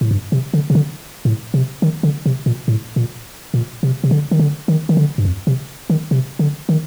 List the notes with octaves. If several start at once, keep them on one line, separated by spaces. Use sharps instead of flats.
A2
G2
C3
D3
C3
D3
A2
C3
D#3
D3
C3
A#2
A2
A#2
A#2
C3
C3
D3
D#3
D3
D#3
D#3
D3
G2
F2
C3
D#3
C3
D3
D#3